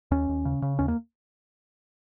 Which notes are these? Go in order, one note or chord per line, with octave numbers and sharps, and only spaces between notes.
D#2 C#4
D#2
C#3
C#3
D#2 C#4
A#3